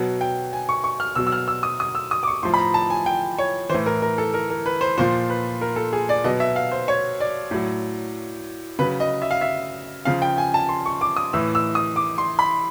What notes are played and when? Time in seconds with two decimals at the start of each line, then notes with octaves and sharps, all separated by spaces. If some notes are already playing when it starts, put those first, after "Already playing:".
Already playing: B2 F#3
0.21 G5
0.53 G#5
0.69 C#6
0.84 C#6
1.00 F6
1.15 B2 F#3 E6
1.27 E6
1.32 F6
1.48 E6
1.63 D#6
1.80 D#6
1.95 E6
2.11 D#6
2.23 D6
2.27 C#6
2.43 A2 F3 C6
2.54 B5
2.58 A#5
2.74 A5
2.90 G#5
3.06 G5
3.38 C#5
3.70 A2 E3 C5
3.86 A#4
4.02 A#4
4.18 A4
4.34 A#4
4.50 A#4
4.66 B4
4.81 C5
4.98 A#2 F3 C5
5.30 B4
5.61 A#4
5.76 A4
5.93 G#4
6.09 D5
6.24 B2 F#3 D#5
6.40 E5
6.56 F5
6.72 C5
6.88 C#5
7.20 D5
7.51 A2 F#3
8.79 C#3 F#3 B4
9.00 D#5
9.22 E5
9.31 F5
9.41 E5
10.05 C#3 F3 F5
10.22 G5
10.38 G#5
10.54 A5
10.69 C6
10.86 C#6
11.01 D6
11.17 D#6
11.33 A2 E3 E6
11.55 E6
11.75 D#6
11.96 D6
12.18 C6
12.39 B5